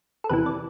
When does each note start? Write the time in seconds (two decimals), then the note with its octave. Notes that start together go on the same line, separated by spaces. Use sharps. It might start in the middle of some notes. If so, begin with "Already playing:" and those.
0.24 A4
0.29 E2 C3 E3 B4
0.46 D5